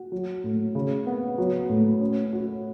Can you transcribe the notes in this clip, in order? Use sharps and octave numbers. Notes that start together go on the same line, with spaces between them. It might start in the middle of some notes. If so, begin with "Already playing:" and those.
Already playing: F#4
F#3
A2
C#3
B3
F#3
A2
C#4
F#4